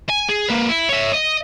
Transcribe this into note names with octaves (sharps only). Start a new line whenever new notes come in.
G#5
G#4
A#3 B4
E4
C#5 E5
D#5